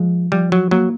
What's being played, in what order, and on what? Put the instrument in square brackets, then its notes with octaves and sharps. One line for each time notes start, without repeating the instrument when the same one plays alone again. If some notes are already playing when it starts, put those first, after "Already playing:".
Already playing: [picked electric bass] F3 [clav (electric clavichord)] G#3
[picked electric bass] F3 [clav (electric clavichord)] G3
[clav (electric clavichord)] F#3
[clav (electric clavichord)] F#3 [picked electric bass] A#3